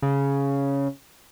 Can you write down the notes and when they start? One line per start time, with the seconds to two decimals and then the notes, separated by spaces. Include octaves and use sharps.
0.02 C#3